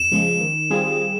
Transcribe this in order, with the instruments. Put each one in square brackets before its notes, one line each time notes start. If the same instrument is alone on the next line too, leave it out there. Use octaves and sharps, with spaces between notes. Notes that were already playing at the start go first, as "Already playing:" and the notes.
Already playing: [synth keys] F2 [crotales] E7
[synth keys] C#3 F3 G#3
D#3
G3 C4 F4 G#4